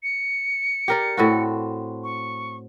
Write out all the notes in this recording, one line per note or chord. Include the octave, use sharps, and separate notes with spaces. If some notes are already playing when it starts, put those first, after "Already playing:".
C#7
G4 A#4 D5
A2 C4 F#4
C#6